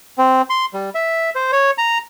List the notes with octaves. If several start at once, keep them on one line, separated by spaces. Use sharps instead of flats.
C4
C6
G3
E5
C5
C#5
A#5